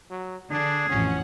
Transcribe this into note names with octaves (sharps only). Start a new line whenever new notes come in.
F#3
D3 D4 G#4
A1 F2 C#4 F#5